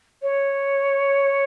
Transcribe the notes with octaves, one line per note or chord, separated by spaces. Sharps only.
C#5